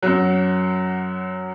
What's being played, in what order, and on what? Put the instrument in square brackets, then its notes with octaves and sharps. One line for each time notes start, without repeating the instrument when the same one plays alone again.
[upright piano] F#2 F#3